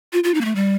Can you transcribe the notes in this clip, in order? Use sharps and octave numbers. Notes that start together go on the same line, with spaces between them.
F4
F4
D#4
A#3
A3
G3